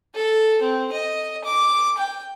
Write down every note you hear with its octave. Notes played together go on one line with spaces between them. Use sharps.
A4
C4
D#5
D6
G5